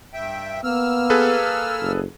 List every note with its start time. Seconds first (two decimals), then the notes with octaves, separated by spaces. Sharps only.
0.13 G2 E5 G5
0.64 A#3 B3 E6 F6
1.10 G#4 A4 B4
1.81 F#1